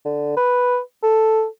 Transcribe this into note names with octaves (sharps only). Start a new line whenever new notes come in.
D3
B4
A4